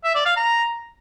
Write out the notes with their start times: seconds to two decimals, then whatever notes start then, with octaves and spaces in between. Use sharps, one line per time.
0.04 E5
0.15 D5
0.26 F5
0.36 A#5